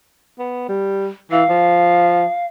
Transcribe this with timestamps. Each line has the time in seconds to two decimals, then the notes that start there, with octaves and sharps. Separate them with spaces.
0.39 B3
0.69 G3
1.31 E3 F5
1.49 F3